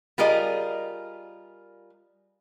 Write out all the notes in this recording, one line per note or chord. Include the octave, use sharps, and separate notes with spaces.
G3 F4 G#4 A#4 D5 D#5